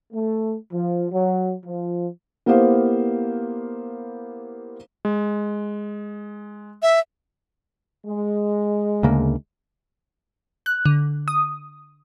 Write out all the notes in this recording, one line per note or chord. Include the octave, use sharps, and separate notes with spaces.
A3
F3
F#3
F3
A#3 B3 E4 G4 C5 F5
G#3
E5
G#3
D2 C#3 A#3
F#6
D3
D#6